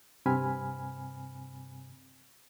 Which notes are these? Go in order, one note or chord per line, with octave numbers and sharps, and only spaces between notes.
G2 C3 C4 G#5 B5 F6